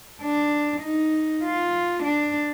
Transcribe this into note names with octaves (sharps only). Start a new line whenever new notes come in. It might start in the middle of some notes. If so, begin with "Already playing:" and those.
D4
D#4
F4
D4